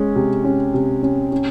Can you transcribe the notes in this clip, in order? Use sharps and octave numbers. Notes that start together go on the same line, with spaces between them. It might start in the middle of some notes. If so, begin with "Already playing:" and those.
Already playing: G#3 C#4
C3
C#4
C3
C#4
C#4